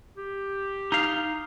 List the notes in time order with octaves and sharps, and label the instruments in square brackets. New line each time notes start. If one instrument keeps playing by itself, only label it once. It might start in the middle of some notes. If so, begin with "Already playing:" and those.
[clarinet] G4
[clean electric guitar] D#4 F5